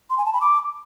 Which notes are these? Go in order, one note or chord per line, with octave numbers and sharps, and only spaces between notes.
C6
G#5
A5
B5
D6